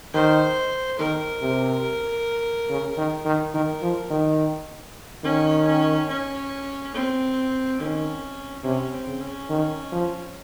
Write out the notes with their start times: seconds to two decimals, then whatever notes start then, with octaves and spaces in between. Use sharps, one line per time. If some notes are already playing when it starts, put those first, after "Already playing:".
0.13 D#3 C5
0.99 D#3 A#4
1.42 C3
2.70 C#3
2.97 D#3
3.25 D#3
3.54 D#3 A#4
3.82 F3
4.10 D#3
5.24 D#3 C#4
5.67 C#4
6.09 C#4
6.94 C4
7.79 D#3 C#4
8.64 C3 C#4
8.93 C4
9.07 C#3
9.21 C#4
9.49 D#3
9.92 F3